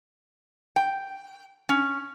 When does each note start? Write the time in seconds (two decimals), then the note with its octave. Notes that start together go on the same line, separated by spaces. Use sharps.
0.76 G5
1.69 C#4